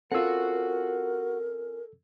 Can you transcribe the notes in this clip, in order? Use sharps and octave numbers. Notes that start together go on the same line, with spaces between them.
C4 C#4 F4 F#4 A4 A#4 F#5 E6